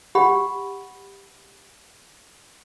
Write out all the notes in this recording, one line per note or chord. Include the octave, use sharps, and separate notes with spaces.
G4 F#5 B5